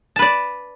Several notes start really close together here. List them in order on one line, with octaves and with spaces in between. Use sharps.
A5 B4 D5